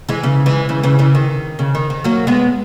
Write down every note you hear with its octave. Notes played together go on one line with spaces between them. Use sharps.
E3 G#3
C#3 E3
E3 G#3
C#3 E3
C#3 E3
C#3 E3
D#3
C#3
D#3
D#3
F#3 A#3
G#3 B3